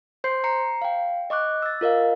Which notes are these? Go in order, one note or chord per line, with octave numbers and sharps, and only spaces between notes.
C5 C6 G6 C7
A#5 C7 C#7
F5 G5
D#5 C#6 D6 F#6
E6 A6
F4 A#4 D#5 F5